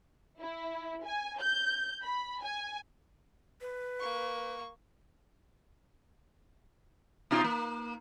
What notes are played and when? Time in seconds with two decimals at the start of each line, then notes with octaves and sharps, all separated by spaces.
0.40 E4
1.04 G#5
1.41 G6
2.03 B5
2.41 G#5
3.61 B4
4.00 A#3 C#6
7.31 B2 D#4 F4
7.44 A#3